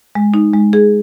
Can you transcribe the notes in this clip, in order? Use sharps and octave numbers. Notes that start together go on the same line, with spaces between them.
G#3
D#4
G#3
G#4